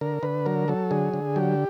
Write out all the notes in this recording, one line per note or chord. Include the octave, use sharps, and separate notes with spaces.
D3 A#4
D3 B4
F#3 A#4
F#3 A4
D3 G#4
D3
F#3 G4